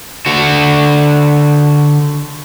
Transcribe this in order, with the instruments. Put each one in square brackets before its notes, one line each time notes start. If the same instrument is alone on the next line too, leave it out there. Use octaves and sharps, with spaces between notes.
[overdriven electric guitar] D3 F#4